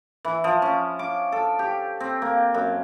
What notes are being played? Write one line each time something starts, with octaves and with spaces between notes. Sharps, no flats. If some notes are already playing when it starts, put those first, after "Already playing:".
E3
F3
C#4
D6
A4
G4
C4
A#3
F#2